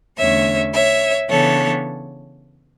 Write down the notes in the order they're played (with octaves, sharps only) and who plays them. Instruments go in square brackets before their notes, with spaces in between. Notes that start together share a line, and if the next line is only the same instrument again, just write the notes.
[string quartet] E2 D3 A3 C#4 C#5 E5
C#5 E5
C#3 E3 B3 D4 A4 C#5